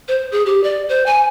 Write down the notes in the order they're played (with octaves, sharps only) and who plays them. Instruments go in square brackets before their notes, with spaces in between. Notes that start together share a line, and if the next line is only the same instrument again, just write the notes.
[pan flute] C5
G#4
G4
D5
C5
G#5